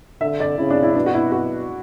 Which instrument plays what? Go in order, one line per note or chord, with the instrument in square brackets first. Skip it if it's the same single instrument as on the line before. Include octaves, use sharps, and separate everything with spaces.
[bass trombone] D3 [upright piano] E5
[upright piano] D5
[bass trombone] C#3 [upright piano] E4
[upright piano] D4
E4
[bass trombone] B2 [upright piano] D4
[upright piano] F#4
E4
F#4